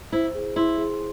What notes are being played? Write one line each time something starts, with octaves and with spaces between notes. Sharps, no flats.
E4 C5
G#4
E4 C6
G#4